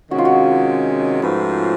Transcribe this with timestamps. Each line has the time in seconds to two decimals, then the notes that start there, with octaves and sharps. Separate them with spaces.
0.11 C3 D#3 G#3 C#4 F#4
0.18 F4
0.25 F#4
1.22 G#2 F3 A3 C#4 F4 B4